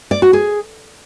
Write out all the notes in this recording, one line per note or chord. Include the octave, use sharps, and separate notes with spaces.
D5
F#4
G#4